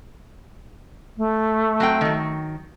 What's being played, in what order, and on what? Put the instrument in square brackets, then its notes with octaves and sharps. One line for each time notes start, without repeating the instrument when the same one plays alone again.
[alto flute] A3
[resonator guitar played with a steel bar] F#3 C4 G5
D#3 F#3